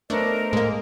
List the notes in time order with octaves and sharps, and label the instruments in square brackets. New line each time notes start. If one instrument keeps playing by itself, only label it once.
[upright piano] A3 B3 A4 [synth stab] D4 [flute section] A#4 C5 D#5
[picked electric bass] A2 [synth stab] G#3 A#3